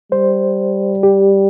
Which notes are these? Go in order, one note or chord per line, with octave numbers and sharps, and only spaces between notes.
G3 C5
G4